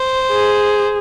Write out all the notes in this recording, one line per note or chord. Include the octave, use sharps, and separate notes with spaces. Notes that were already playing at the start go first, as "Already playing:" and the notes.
Already playing: C5
G#4